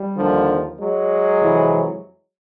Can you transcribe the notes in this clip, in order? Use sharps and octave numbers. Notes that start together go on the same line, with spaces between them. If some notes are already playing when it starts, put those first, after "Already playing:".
Already playing: G3
D#2 D3 F3
F#3 G#3
F2 C3 E3